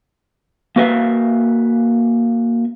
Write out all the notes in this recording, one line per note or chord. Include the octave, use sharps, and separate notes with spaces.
A#3 F#4 B4 E5 F5